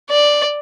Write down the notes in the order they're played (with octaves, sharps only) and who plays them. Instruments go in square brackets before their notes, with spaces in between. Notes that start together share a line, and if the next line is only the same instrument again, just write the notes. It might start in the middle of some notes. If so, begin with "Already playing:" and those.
[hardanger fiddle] D5